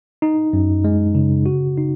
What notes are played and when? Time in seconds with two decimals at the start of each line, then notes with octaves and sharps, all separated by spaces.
0.22 D#4
0.53 F#2
0.84 G#3
1.15 C#3
1.46 F#4
1.78 D#4